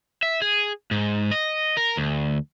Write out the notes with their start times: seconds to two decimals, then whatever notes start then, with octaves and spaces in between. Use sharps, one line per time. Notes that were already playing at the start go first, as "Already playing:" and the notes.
0.23 E5
0.42 G#4
0.91 G#2
1.31 D#5
1.77 A#4
1.97 D2